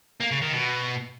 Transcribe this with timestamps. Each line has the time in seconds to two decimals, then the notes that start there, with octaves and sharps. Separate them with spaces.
0.20 A#3
0.31 C#3
0.42 D#3
0.52 B2